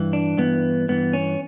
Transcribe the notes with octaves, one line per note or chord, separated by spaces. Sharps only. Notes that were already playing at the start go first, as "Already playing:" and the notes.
Already playing: G2 E3
D4
G2 E3 B3
G2 E3 B3
C#4